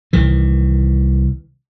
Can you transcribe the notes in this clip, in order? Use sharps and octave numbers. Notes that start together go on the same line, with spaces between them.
C2 D#3 E3